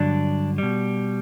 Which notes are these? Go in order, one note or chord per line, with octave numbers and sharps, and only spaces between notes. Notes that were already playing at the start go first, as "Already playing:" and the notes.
Already playing: G2 D3 F#3 D4
B2 G3